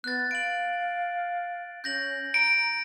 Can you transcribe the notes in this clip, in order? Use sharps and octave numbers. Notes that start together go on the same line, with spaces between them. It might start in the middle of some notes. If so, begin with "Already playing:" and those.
B3 F#6 A6
F5 D7 F#7
C#4 G6 A#6 F#7
A#5 D7